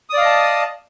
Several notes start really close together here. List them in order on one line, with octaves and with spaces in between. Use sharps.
D#6 D5 F5 D#5 A5